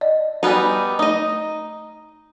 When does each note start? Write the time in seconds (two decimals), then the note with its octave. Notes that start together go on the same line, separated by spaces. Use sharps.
0.01 D5 D#5
0.43 G3 B3 D#4 F#4 G#5
0.99 A3 D#4 D#5